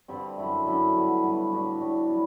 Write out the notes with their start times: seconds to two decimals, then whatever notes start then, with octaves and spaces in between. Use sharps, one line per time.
0.08 G2 D3 G3 C4
0.37 F#2 D3 A3 E4
0.66 F#2 D3 A3 E4
0.95 G2 F#3 B3
1.23 G2 F#3 B3
1.52 A2 G3 D4 F#4
1.80 A2 G3 D4 F#4
2.09 F#3 B3